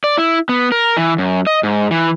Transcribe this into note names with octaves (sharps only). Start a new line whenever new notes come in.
D5
E4
B3
A#4
E3
F#2
D#5
G#2
E3